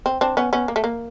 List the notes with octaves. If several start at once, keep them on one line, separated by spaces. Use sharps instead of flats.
C4
C4 D4
B3 C#4
B3 C#4
A#3
A3
A#3